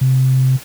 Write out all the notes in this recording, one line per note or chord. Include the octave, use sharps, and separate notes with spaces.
C3